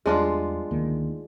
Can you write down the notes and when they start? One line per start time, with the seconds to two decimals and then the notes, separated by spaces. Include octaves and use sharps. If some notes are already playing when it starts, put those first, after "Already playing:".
0.06 E2 G3 G#3 D4 F4
0.71 D2 D#3 A#3